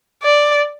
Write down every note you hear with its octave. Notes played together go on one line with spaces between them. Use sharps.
D5